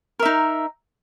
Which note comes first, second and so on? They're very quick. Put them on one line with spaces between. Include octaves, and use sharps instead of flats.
A#4 E5 D#4